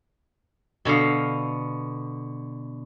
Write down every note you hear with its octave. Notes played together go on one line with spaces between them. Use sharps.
B2 D3 B3 F5